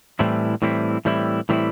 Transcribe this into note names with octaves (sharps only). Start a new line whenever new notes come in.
A2 E3 G3 C4 E4
A2 E3 G3 C4 E4
A2 E3 G3 C4 E4
A2 E3 G3 C4 E4